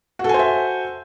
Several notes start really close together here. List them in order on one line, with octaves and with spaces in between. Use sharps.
F#4 A4 G#5 C5 E5